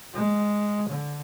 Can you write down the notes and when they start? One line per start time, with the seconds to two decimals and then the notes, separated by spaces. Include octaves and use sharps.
0.13 G#3
0.89 D3